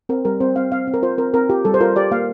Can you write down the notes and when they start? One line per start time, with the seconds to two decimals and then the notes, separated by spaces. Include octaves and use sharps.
0.09 C4 A#4
0.25 G3 A#4
0.40 C4 C5
0.56 C4 F5
0.72 C4 F5
0.87 C4
0.94 A#4
1.03 F4 C5
1.18 C4 A#4
1.34 C4 A#4
1.50 F4 G4
1.65 G3 A4
1.74 C5
1.80 F4 A#4
1.96 G4 D5
2.11 A#3 F5